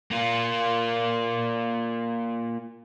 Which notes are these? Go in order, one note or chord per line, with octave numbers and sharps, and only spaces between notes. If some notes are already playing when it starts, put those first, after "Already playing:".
A#3 F4